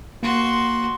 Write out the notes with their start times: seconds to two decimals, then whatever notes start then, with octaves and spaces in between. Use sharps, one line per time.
0.23 A#3 F#4 C6